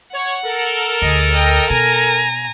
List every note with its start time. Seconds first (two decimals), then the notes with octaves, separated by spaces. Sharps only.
0.14 C#5 F#5
0.45 A4 A#4
1.02 D2 G#4 D#5
1.32 D#5 G5
1.70 B2 G#5 A#5